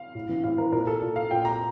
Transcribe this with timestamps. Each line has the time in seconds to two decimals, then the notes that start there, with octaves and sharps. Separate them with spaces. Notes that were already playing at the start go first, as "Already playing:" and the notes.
Already playing: F5
0.15 A2
0.29 E3
0.44 A2 F5
0.58 E3 A#4
0.72 A#2 A#4
0.87 A4
1.02 A#2
1.16 F5
1.31 A#2 G5
1.45 A#5